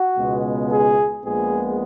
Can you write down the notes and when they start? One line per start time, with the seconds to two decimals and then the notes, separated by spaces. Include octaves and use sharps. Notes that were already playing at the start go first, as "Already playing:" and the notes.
Already playing: F#4
0.17 C#2 B2 G#3 B3
0.70 G#4
1.23 A#1 A#2 G#3 B3 G#4